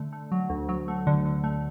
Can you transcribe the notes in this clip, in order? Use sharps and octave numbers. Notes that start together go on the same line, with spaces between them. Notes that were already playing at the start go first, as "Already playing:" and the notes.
Already playing: D3 A3
A3
F#3
D2
F#3
A3
D3
D3
A3